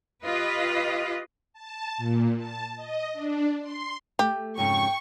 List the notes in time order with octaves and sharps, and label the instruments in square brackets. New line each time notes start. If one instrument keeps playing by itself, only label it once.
[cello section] F4 G4 B4 D#5
[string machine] A5
A#2
A5
D#5
D4
C6
[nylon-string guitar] A3 [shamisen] G4
[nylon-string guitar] F2 G#2 C#3 [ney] G5 [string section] C#6